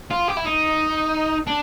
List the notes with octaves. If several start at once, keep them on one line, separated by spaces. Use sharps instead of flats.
F4
G4
E4
D#4
D4